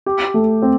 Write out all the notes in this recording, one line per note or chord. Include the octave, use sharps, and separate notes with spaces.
G4
A3
C4